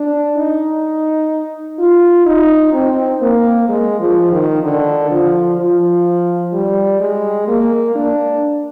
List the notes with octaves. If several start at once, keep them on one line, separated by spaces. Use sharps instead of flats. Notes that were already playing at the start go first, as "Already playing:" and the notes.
Already playing: D4
D#4
F4
D#4
C4
A#3
G#3
F3
D#3
D3
F3
F3
G3
G#3
A#3
D4